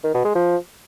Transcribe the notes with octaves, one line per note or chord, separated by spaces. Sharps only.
D#3
B2
G#3
F3